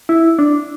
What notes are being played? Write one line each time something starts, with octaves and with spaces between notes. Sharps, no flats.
E4
D4